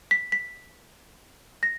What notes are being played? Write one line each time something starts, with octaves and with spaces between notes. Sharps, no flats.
B6
B6
A#6